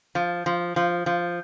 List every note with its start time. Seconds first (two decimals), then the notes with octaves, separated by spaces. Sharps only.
0.15 F3
0.46 F3
0.76 F3
1.06 F3